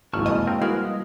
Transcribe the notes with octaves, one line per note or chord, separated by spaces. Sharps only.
G#1 C#2 F3 A#3 E4 A5 C#6 F6
F2 B2 G#3 D#5 G#5
C4 A#4
G3 G#3 E4 F#4 A#4 B4 F5
D#5 D#6